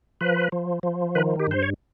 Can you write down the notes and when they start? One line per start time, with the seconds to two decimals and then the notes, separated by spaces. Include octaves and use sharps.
0.21 F3 B4
0.52 F3
0.83 F3
1.15 D#3 B4
1.40 G4
1.47 G2 C5
1.63 C#5